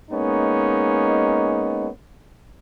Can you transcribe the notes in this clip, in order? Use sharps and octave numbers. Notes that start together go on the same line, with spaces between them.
G#3 A#3 B3 C#4 D#4